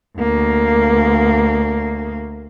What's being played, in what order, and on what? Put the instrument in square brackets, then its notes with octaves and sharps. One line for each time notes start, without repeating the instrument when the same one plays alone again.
[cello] D2 A#3